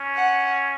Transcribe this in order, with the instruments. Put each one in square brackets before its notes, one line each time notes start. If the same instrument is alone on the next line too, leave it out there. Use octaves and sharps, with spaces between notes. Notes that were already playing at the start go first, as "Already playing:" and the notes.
Already playing: [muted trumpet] C#4
[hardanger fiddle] F#5